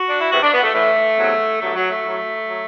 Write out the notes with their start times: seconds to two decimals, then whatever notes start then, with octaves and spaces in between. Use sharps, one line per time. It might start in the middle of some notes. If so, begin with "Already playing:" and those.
Already playing: F#4
0.09 D4
0.21 E4
0.31 E2 C3 E3 F#4
0.43 D4
0.53 B3
0.63 A3
0.74 A2 E3 A3
1.18 E2 C3 F#3
1.61 G2 D3 F#3 A3
1.75 F#3
1.89 A3
2.03 A2 F#3
2.46 F#3